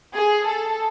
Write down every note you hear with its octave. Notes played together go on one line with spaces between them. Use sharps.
G#4
A4